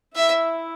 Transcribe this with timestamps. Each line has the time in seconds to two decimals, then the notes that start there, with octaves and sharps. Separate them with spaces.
0.15 E4 E5